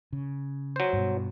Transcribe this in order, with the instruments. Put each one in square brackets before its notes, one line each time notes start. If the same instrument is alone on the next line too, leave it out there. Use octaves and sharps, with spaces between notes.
[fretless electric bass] C#3
[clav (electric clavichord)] F#3 C5
[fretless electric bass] G2 B2